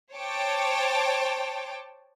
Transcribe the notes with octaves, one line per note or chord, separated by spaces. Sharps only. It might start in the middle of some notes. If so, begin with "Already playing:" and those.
C5 C#5 G5 A5 D6